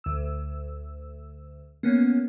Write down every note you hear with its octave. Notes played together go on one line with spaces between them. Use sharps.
D2 E6
A#3 B3 C#4